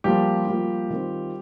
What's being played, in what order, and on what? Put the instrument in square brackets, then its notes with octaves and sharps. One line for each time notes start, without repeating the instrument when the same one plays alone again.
[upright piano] F3 A#3 F4 [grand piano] G3 G4
[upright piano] F3 A#3 F4
D#3 C4 F4